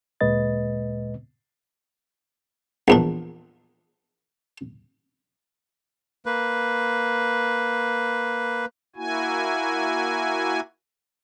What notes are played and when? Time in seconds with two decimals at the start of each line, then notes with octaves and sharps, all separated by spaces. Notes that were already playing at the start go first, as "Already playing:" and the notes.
0.21 D2 A#2 G#3 B4 D#5 A6
2.88 A#1 E2 D4
6.26 A#3 B4
8.96 A#3 E4 F#4 G#5